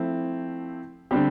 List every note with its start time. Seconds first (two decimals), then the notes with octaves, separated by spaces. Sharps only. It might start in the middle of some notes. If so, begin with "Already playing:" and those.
Already playing: F3 A3 C4 E4
1.11 D3 G3 C4 G4